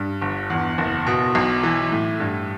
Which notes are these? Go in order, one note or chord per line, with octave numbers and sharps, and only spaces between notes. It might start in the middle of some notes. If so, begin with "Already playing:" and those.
Already playing: G2
G1
E2
F#1
B2
B1
E3
A2
G2